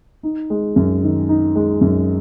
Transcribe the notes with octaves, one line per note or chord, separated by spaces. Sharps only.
D#4
G#3
F#2
D#3
D#4
G#3
F#2